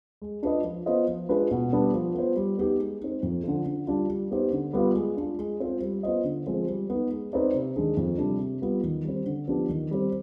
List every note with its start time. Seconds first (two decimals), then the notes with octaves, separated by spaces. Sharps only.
0.22 G#3
0.43 D4 F4 B4 D#5
0.64 F3
0.86 B3 F4 C5 D#5
1.08 F3
1.29 G#3 D4 F4 B4
1.51 B2
1.73 G3 B3 D4
1.94 F3
2.15 B3 F4 C5
2.36 G3
2.58 B3 D#4 G4
2.80 G#3
3.01 C4 D#4
3.23 F2
3.44 D3 F3
3.66 D3
3.87 G3 D4 F4
4.09 G3
4.31 B3 D#4 G4 C5
4.53 D3
4.73 G3 B3 F4
4.95 G#3
5.17 D4 F4
5.39 G#3
5.60 C4 F4 C5
5.82 G3
6.03 B3 F4 C5 D#5
6.25 D3
6.47 F3 G#3 C4
6.68 G3
6.90 B3 D#4
7.11 G#3
7.33 C4 D#4 B4 D5
7.55 C3
7.76 D#3 G#3 D4 G#4
7.97 F2
8.18 C3 G3 D4
8.40 C3
8.62 G3 B3 F4
8.84 D#3
9.04 G3 C4
9.26 D3
9.48 F3 B3 D4 G4
9.69 D#3
9.91 G3 C4